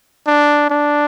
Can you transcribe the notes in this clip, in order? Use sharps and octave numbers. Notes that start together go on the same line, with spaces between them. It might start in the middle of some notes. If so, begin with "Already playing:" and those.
D4
D4